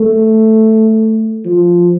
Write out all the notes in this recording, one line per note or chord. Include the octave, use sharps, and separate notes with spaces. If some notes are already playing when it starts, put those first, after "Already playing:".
Already playing: A3
F3